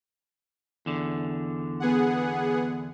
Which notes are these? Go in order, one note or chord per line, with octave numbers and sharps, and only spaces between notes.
E2 D3
B3 G#4 F#5